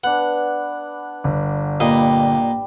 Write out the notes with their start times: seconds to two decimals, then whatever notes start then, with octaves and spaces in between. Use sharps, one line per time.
0.04 B3 D4 F#5
1.24 G1
1.80 A#2 G3 D#5 B5